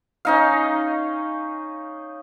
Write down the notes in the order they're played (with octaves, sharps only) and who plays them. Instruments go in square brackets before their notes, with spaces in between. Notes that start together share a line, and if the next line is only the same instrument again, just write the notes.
[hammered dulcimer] C#4 D#4 F5